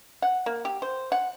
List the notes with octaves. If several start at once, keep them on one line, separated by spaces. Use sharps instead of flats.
F#5
A#3
G4
C5
F#5